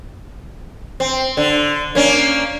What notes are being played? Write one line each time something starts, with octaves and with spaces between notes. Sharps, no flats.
C4
D3
A#3 C#4 D4